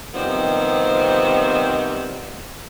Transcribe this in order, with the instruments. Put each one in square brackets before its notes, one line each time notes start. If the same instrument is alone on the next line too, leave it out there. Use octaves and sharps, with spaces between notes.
[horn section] C3 D#3 F3 G3 B3 C4